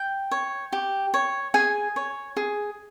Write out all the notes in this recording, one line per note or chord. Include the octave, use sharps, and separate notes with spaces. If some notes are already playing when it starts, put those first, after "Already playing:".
Already playing: G5
C#5
G4
C#5
G#4 G#5
C#5
G#4